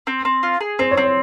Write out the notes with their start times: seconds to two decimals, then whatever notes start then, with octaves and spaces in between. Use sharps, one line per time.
0.07 C4
0.25 C4
0.43 F4
0.60 G#4
0.79 C4 C5
0.91 C#5
0.97 C4
1.03 C#5